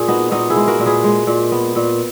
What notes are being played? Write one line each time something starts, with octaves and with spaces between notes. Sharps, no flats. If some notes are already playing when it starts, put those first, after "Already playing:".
Already playing: A#2 G#4
B3 D#4 F#4
A#2 D#4 F#4
E4 G#4
G#3
F#4 A#4
A#2
G#4 B4
G#3
A#2
B3
A#2